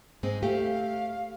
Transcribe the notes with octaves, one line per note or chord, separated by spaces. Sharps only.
G#2 G#3 C4
A3 G4 F5